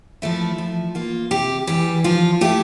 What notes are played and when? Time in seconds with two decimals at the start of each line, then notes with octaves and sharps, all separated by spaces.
0.22 F3 A3 E4
0.58 F3
0.95 A#3 F4
1.31 C3 G4
1.67 E3 G3 G4
2.04 F3 F4
2.41 A3 E4 G4